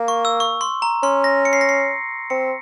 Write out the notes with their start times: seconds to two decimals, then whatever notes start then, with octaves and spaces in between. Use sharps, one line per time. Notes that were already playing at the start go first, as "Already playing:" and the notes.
Already playing: A#3
0.08 C#6
0.25 E6
0.40 C#6
0.61 C6
0.82 A#5
1.03 C#4 C6
1.24 A#6
1.45 C#7
1.53 C7
1.61 A#6
1.69 C7
2.30 C4 C#7